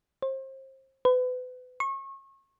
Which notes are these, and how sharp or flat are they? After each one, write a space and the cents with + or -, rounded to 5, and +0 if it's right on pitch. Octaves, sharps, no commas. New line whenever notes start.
C5 +30
B4 +35
C#6 -30